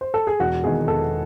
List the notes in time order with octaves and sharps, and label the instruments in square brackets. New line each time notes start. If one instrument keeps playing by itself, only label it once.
[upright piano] C5
A4
G#4
E1 F#4
E2 D#3 G#4
E1 A4